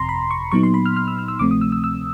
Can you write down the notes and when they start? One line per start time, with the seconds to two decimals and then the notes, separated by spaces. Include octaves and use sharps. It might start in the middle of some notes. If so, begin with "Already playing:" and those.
Already playing: G1 F2 C3 A#5 C6
0.09 B5
0.31 C#6
0.52 A#2 F#3 B3 D#4 C#6
0.63 C6
0.74 B5
0.86 F6
0.96 F6
1.08 E6
1.19 F6
1.28 E6
1.39 D2 C3 F3 A3 C4 D6
1.51 D#6
1.61 E6
1.72 E6
1.84 E6